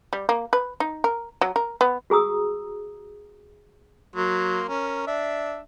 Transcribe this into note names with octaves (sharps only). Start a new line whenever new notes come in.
G3
A#3
B4
D#4
A#4
F#3
A#4
B3
F#4 G#4 A#5 D#6 E6
F#3 A#3 C6
C#4 A#4
D4 E5